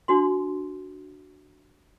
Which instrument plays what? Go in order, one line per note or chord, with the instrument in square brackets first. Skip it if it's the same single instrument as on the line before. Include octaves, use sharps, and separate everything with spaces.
[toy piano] D4 F#4 C6